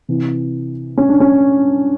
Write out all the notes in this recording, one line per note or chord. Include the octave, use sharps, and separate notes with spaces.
C3 E3
C#4
D4
C#4